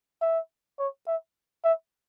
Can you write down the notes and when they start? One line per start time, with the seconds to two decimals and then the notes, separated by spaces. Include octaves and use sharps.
0.22 E5
0.79 C#5
1.07 E5
1.64 E5